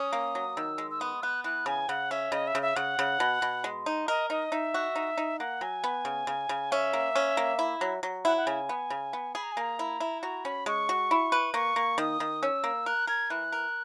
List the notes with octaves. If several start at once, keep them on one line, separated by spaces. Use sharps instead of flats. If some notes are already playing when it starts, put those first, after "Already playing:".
Already playing: C#4 D#6
A#3
F#3
D#3 E6
G#3
E6
B3 D#6
B3 F#6
E3 F#6
C#3 G#5
C#3 F#5
C#4 E5
C#3 D#5
E5
C#3
E5
C#3 F#5
C#3
B2
B2
G#3
D#4
A#4 D#5
D#4 D#5
D#4 E5
F#4
D#4
D#4
A#3 F#5
F#3 G#5
B3
C#3
C#3
C#3
C#4 E5
A#3
C#4
A#3
E4
F#3
F#3
E4 F#5
F#5
C#3 G#5
B3
C#3
B3
G#4 B5
A#5
G#5
A#3 A#5
E4
E4
F#4 A#5
C#4 B5
G#3 C#6
F#4
E4
B4
A#3 C#6
A#3
D#3 D#6
D#3
C#4 E6
A#3
A#4 F#6
A#4 G#6
E3 F#6
A#4